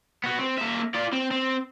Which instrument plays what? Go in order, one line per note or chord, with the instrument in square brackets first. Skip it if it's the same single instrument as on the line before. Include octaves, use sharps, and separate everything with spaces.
[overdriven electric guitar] B3 F#4
C4
A#3 E5
F4 D5
C4
C4